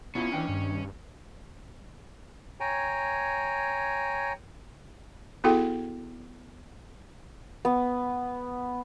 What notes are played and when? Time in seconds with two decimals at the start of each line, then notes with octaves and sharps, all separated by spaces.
0.15 B2 B3 C#4 E4 F4
0.31 D#2 E3 D4 G5
0.49 G2
2.60 C#5 G5 G#5 A#5
5.44 B3 E4 F#4 G#4 A4 G5
7.65 B3